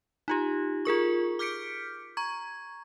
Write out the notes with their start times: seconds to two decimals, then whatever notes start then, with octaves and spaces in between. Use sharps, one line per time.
0.28 D#4 F4 G4
0.85 F4 G#4 A#4 C#6
1.39 D6 F6 G6 B6 C#7 D7
2.17 A#5 C#6 G#6